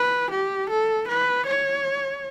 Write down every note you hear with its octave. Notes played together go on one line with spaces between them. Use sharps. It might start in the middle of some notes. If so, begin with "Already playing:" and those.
Already playing: B4
G4
A4
B4
C#5